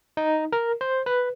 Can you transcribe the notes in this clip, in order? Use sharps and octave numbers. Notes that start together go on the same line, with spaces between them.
D#4
A#4
C5
B4